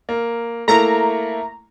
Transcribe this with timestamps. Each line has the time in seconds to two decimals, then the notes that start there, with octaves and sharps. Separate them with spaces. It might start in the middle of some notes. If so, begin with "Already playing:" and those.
0.09 A#3
0.68 A3 A#3 E4 A#5